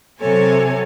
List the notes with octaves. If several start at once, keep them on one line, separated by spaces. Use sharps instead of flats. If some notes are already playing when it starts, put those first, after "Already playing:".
C3 F#3 A4 C#5 G#5